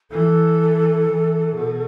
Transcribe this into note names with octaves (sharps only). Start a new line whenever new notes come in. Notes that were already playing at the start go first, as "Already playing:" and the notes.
E3 A4
E3
B2